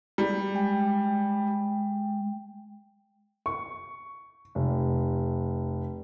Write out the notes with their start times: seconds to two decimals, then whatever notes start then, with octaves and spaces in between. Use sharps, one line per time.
0.18 G3
0.54 G#3 G5
3.46 C#6
4.55 F1